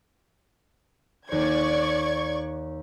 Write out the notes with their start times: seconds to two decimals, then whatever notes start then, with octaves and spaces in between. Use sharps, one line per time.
1.29 D#2 C5 D5 C#6 G#6